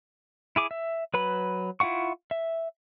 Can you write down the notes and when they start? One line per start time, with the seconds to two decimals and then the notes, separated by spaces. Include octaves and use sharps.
0.56 E4 G#4 D6
0.71 E5
1.14 F#3 B4 B5
1.80 E4 F4 F5 F#5 C#6
2.31 E5